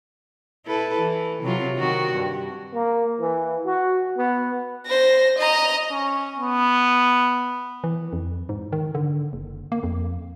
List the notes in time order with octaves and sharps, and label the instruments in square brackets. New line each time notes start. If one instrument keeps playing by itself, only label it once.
[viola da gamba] E4 A4 B4
E3
C3 F#3 F4
D#3 C4 F#4
G2
[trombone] A#3
E3
F#4
B3
[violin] C5 A#6
D#5 A#5
[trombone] C#4
B3
[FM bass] E3
F2
G#2
D#3
D3
F#1
A#3
F2